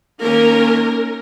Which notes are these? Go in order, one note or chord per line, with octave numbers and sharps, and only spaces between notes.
D#3 A#3 C#4 A#4